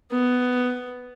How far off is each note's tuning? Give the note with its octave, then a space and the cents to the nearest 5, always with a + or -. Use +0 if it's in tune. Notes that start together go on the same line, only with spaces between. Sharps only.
B3 +10